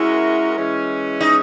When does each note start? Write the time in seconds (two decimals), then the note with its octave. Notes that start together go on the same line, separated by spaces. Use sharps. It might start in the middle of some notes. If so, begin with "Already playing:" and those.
Already playing: G#3 C#4 E4 F#4 A#4
0.56 E3 G#3 C#4
1.21 D#4